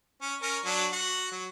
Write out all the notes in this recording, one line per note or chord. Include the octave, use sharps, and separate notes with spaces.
C#4
C#4 A#4
F#3 D4
F#4 F#5
F#3